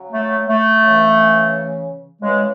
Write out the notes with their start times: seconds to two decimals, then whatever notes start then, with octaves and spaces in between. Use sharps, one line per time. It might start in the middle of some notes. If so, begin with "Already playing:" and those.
Already playing: C#3 F#3
0.12 A3
0.47 A3
0.82 C#3 E3
2.21 C#3 E3 G#3